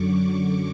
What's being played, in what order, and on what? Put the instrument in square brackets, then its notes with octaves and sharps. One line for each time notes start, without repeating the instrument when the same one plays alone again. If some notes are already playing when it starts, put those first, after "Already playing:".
Already playing: [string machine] F#2 D3 F#3 C#6 D6